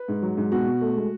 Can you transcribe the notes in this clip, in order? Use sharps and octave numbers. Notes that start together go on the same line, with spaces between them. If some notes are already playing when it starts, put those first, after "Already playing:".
Already playing: B4
G#2
F#3
G#2
B2 F#4
B2
A3
G#3